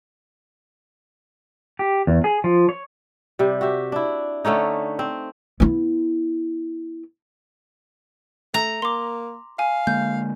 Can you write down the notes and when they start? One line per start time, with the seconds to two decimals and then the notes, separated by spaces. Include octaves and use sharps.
1.79 G4
2.07 E2
2.24 G#4
2.44 F3
2.69 C#5
3.39 C3 G3
3.61 F#4 G4 E5
3.92 D4 E4
4.45 D3 A3 C#4 D#4
4.99 C4
5.60 B3 E4
8.54 A3 A#5
8.82 A#3 C6 D6
9.59 F5 G#5
9.87 D3 G#3 A#3 G6